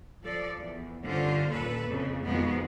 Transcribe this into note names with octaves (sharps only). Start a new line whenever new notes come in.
F3 A4 D5
E2
G2 D3 C#4 F4 C5
D#2 A#2 A4 B4
F2 C#3
F2 B2 D#3 F3 G#3 B3